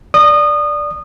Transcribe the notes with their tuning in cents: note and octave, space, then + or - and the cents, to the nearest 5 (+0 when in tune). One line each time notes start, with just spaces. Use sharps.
D5 +0 D#6 -25